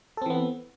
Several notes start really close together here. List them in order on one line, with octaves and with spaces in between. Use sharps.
A4 C4 E3 B3